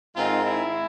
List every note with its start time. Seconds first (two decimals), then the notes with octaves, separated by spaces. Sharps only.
0.15 G#2 D#3 G#3 C4 F4
0.45 E4